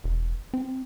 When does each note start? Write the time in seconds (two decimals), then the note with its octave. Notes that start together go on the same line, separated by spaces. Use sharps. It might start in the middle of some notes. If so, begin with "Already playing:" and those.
0.04 E1
0.54 C4